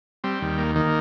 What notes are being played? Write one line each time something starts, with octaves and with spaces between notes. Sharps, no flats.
G3 C4
D#2
A#3
D#3 A#3